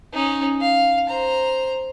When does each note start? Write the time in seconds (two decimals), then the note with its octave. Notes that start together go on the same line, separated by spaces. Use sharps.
0.13 C#4 D#4
0.61 F5
1.08 C5 A#5